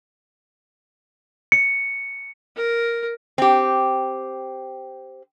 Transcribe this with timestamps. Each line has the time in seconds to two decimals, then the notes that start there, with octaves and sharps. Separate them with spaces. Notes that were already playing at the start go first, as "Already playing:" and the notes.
1.52 C#7
2.56 A#4
3.38 C4 G4